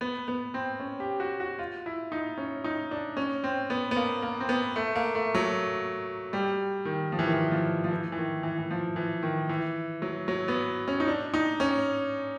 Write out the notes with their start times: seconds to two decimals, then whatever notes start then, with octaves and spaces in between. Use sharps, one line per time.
0.01 B3
0.28 B3
0.54 C4
0.80 C#4
1.00 G4
1.20 F#4
1.40 F#4
1.59 F4
1.86 E4
2.12 D#4
2.38 C#4
2.64 D#4
2.91 D4
3.17 C#4
3.44 C4
3.70 B3
3.91 B3
3.96 A#3
4.22 A#3
4.40 C4
4.49 B3
4.76 A3
4.95 A#3
5.15 A3
5.35 F#3
6.33 G3
6.85 D#3
7.12 F3
7.19 E3
7.26 D#3
7.33 E3
7.52 F3
7.84 F3
7.91 E3
8.12 E3
8.18 D#3
8.43 E3
8.58 E3
8.71 F3
8.96 E3
9.23 D#3
9.49 E3
10.02 F#3
10.28 F#3
10.48 B3
10.88 C#4
11.00 D#4
11.08 D4
11.34 D#4
11.60 C#4